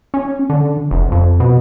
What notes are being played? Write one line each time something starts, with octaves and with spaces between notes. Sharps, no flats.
C#4
D3
F1
F2
B2